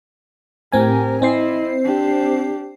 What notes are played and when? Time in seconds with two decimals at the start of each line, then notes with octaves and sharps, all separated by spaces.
0.72 A2 C4 G4 A#4 G#5
1.22 C4 E4 C5 D#5 C7
1.84 D4 G4